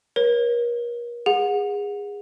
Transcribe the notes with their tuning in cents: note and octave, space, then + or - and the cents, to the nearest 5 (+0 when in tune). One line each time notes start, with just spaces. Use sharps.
A#4 +40 C#5 -25
G#4 -25 F#5 -25